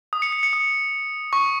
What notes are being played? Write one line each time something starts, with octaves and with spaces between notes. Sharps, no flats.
D#6
C#7
C#7
C#7
D#6
C#6